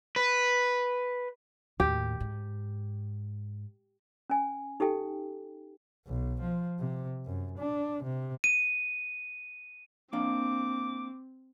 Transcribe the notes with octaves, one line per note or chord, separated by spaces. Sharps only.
B4
D#2 A2 G4
G#2
C#4 G#5
D#4 G4 A4 G5
B1
F3
C3
F#2
D4
C3
D#7
A#3 C4 D4 F5 D6